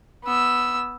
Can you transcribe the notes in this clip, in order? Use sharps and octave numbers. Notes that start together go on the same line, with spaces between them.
B3 E6